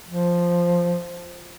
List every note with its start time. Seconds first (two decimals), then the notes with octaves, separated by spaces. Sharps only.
0.07 F3